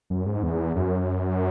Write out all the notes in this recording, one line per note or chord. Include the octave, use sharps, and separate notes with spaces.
F#2
G#2
E2
F#2